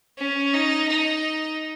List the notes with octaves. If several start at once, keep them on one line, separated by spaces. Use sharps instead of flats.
C#4
D#4
D#4